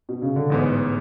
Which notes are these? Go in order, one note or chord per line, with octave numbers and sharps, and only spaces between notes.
B2
C#3
D3
A1 G#2 E3 G#3 B3